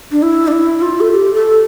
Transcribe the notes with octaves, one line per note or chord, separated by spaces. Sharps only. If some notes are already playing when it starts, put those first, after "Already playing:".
D4
E4
D4
E4
F4
A4
G4
A4